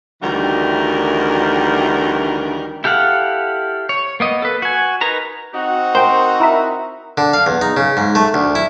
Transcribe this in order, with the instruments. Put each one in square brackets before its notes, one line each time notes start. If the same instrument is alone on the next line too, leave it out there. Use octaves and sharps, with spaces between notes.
[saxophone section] D2 D#3 E3 G3 F#4 A#4
[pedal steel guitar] E4 G4 A4 F5 F#5
C#5
A#3 B3 D#5
A4 B4
F#4 G#5
D#4 A#4 B4 A#5
[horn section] C4 D#4 F#4
[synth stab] A#4 G5 [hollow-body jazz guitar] C5
[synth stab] E4 A#4 E5
[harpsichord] D3
F5
E2
D#4
C#3
G#2
A3
D2
E4